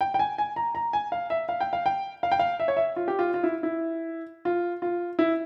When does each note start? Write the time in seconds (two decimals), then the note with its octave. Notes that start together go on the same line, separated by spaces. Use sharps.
0.01 G5
0.14 G5
0.19 G#5
0.38 G#5
0.56 A#5
0.75 A#5
0.93 G#5
1.12 F5
1.30 E5
1.49 F5
1.61 G5
1.73 F5
1.86 G5
2.23 F5
2.32 G5
2.39 F5
2.60 E5
2.68 C#5
2.77 E5
2.96 F4
3.08 G4
3.19 F4
3.34 F4
3.43 E4
3.63 E4
4.45 F4
4.82 F4
5.19 E4